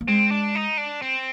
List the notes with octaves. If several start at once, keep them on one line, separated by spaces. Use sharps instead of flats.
A#3
G#3 C4
D4
D#4
D4
C4